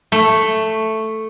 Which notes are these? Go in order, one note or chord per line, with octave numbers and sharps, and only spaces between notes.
A3